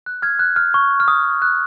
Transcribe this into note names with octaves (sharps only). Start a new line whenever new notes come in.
F#6
F6 G#6
F#6
F6
C#6
F6
D#6
F#6